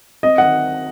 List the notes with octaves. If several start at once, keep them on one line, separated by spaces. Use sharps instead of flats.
C4 D#5
D#3 F#5